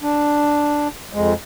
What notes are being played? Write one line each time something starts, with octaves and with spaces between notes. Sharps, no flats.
D4
F2 G#3